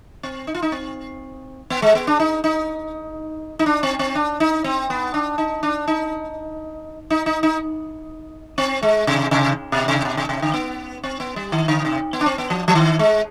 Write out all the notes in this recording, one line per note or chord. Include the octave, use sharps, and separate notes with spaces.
C4
D#4
F4
D#4
C4
B3
G#3
B3
D4
D#4
D#4
D#4
D4
C4
C4
D4
D#4
C4
B3
D4
D#4
D4
D#4
D#4
D#4
D#4
C4
G#3
C3
C3
B2
C3
B2
C3
C3
D3
B3
C4
B3
G3
D#3
D3
C3
B3
D4
C4
B3
F3
F3
D#3
G#3